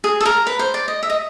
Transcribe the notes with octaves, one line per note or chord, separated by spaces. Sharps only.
G#4
A4
A#4
B4
C5
D5
D#5
E5
D#5